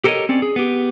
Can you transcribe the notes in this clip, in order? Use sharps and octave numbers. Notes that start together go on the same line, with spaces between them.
G4 A4 A#4 C5 C#5 D#5
C4 C#4 D5
G#4
B3 G4